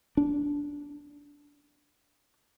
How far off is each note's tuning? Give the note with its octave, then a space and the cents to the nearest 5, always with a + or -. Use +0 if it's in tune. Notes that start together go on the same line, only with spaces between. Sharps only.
D4 -15